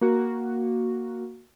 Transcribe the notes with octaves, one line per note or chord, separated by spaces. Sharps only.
A#3 F#4